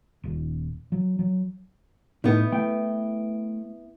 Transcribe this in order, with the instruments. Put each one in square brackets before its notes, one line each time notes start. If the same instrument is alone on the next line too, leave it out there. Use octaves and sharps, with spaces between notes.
[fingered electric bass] D#1
F#3
F#3
[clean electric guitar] A2 D#4 [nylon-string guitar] B3 E4
[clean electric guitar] A3 G5